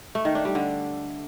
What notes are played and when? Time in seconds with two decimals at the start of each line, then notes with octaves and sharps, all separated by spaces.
0.15 A3
0.25 D#3
0.35 D4
0.45 G3
0.55 D3